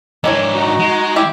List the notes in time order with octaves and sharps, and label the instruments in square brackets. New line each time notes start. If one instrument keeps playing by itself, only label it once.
[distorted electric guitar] G#2 D4 [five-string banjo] D#3 E3 C#5
[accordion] D#4 F#4
[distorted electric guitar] G#3
[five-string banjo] E4 G4